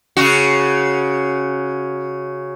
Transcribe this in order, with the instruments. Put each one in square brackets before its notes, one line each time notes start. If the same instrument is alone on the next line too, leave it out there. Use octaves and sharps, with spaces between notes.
[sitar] C#3 F#4